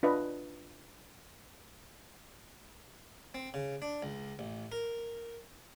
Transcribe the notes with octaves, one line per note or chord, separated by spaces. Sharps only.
D4 F4 B4 D#5
C4
C#3
D4
C#2
A1
A#4